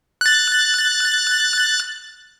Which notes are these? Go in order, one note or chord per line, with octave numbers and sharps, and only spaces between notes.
F#6 A6